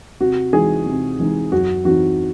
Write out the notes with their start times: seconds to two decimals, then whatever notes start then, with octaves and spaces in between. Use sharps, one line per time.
0.20 C3 F#4
0.53 E3 G#3 D#4 G#4
0.86 C3
1.19 E3 G#3 D#4
1.52 F#2 F#4
1.85 E3 C4 D#4 F#4